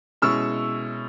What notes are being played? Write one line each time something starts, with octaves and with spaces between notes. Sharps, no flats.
B2 G#3 C#4 E4 C#6 E6